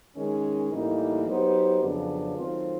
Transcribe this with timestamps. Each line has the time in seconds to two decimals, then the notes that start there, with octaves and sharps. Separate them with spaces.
0.16 D#3 G#3 C#4
0.71 A2 E3 G3 A#3 D#4
1.27 F#3 B3 D#4 G4 C5
1.82 F2 C#3 F#3 B3 D4
2.37 D#3 F#3 A3 C4 F4